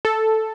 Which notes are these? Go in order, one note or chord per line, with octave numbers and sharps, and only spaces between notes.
A4